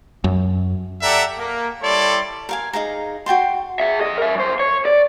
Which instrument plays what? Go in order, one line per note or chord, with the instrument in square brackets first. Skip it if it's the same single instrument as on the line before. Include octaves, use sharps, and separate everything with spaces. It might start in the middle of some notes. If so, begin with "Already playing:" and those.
[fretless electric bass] F#2
[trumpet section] G4 A4 D5 E5 F#5 A#5
A#3
G3 E4 A4 C#5 D5 C6
[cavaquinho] A#4 F5 G#5
D#4 G#4 F5 A#5
F#4 G5 A5 C6
[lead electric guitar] G#4 E5
F2 D#5
A#4 E5
F#2 C5
C#5
D5